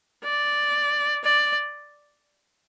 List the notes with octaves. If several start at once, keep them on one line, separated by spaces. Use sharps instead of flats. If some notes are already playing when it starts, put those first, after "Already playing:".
D5
D5